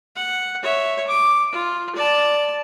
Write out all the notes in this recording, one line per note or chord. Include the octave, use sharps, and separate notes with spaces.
F#5
C#5 E5
D6
F4
D5 A5